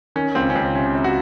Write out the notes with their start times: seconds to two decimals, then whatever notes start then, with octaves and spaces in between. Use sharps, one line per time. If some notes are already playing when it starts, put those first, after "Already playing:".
0.16 D#3 C#4
0.35 C#2 C4
0.50 C#4
0.55 C#2 C4
0.75 C3 C#4
0.95 C3
1.04 F#4